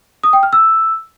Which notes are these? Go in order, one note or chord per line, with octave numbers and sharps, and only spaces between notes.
D#6
G5
F6
E6